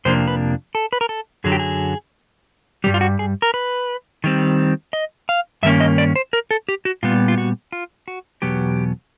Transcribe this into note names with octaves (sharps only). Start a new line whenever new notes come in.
F2 C3 F3 A#3 D4 C5
B4
A4
B4
A#4
A4
F#2 D3 F#3 G#4
G4
G#4
G2 E3 G3 G4
F4
F#4
G#4
A#4
B4
D#3 G3 C4
D#5
F5
G2 D#3 A#3 C#4 E5
D#5
D5
C5
A#4
A4
G4
F#4
A#2 G3 B3 F4
F4
F#4
F4
F#4
E2 B2 F#3 B3 G4